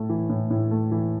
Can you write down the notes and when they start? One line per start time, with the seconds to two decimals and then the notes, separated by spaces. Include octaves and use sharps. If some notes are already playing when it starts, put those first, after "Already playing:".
Already playing: A2 A3
0.09 E3
0.30 A2
0.50 A2
0.71 A3
0.91 E3